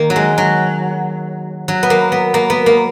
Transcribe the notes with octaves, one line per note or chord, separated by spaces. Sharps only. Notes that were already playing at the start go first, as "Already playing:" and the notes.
Already playing: D#3 A#3
F#3
G#3
F#3
F#3
B3
A#3
B3
A#3
B3
A#3